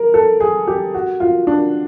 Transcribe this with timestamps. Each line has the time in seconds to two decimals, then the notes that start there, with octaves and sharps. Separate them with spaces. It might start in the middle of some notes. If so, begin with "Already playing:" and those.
Already playing: A#4
0.14 A4
0.40 G#4
0.67 G4
0.94 F#4
1.20 F4
1.47 D4